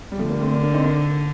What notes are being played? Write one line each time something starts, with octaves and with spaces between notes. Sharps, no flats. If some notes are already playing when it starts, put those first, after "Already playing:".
G3
D3 F3 A3
G3 A#3
A3 C4
A#3 D4
A#3 D4
C4 D#4
A#3 D4